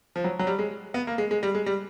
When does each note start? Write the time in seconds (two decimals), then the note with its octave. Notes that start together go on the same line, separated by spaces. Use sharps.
0.16 F3
0.24 F#3
0.39 F#3
0.47 G3
0.59 G#3
0.94 B3
1.07 A#3
1.18 G#3
1.31 G#3
1.43 G3
1.55 G#3
1.66 G3